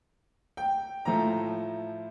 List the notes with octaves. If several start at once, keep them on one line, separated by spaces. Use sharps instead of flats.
G5
A2 F3 A3 A#5